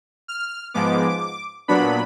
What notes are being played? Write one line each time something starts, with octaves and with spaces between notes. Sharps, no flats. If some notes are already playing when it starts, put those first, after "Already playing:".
F6
G#2 F3 G#3 B3 D6
A#2 F#3 B3 D4 B5